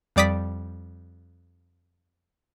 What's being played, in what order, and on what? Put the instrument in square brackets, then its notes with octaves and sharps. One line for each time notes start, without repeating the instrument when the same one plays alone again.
[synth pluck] F2 G3 D5 D#6 B6